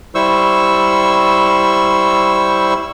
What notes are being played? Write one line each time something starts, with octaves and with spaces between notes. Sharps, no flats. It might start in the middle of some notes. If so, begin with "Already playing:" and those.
G3 E4 C5 C#6 E6